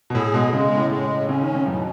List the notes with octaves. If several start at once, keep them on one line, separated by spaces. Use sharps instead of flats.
B2
A2 G#4
B2 G#3
C#3 G#3
A2
G#3
A2
C#3 C#4
D#3
A2
C#3
F#2 B2